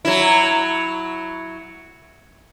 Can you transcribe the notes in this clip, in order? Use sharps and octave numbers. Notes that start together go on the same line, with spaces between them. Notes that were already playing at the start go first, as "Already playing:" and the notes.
F#3 E4